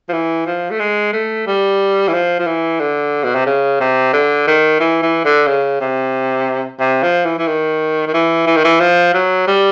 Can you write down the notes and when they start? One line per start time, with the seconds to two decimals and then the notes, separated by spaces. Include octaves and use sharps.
0.09 F3
0.13 E3
0.46 F3
0.71 A3
0.79 G#3
1.13 A3
1.47 G3
2.08 E3
2.14 F3
2.39 F3
2.47 E3
2.80 D3
3.24 B2
3.35 C3
3.46 C#3
3.80 C3
4.13 D3
4.47 D#3
4.80 E3
5.02 E3
5.25 D3
5.47 C#3
5.81 C3
6.80 C3
7.03 F3
7.25 E3
7.39 E3
7.47 D#3
8.07 D#3
8.14 E3
8.47 E3
8.56 D#3
8.64 E3
8.80 F3
9.14 F#3
9.47 G3